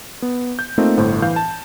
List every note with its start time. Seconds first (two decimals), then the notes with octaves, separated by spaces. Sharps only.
0.22 B3
0.59 G6
0.78 A3 A#3 C4 D#4 F4
0.98 G1 A2 A4 C5
1.22 E3 F5 G6
1.36 A5